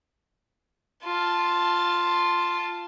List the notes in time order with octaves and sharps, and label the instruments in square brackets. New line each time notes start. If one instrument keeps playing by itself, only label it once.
[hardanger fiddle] F4 A5